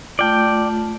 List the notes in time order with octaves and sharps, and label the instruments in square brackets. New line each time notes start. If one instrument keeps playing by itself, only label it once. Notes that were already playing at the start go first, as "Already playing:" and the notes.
[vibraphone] A3 F4 [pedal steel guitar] D5 G5